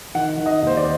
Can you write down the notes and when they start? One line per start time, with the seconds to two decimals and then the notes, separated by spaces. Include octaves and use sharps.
0.15 D#3 F#5
0.37 D#3
0.46 D#5
0.62 D#2 C5
0.77 D5